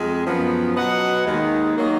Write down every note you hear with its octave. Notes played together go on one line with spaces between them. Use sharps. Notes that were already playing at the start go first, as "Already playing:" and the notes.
Already playing: F2 G#3
F#2 F3 B3
B2 F#3 B3 D#5 F#5
D#2 D#3 G#3
D#3 F#3 A#3